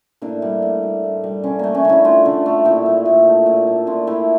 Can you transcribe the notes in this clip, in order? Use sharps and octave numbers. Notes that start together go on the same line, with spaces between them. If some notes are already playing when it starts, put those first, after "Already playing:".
A2 A#3 D4
G3
A2
G3
A2
G3
D3 C#4
A3 A#3
C#4
D3 C#4 E4
A3 D4 F4
D3
A3
A#2 E4 G4
A3
A#2
A3
A#2
A3
A#2 D4 F4
A3 E4 G4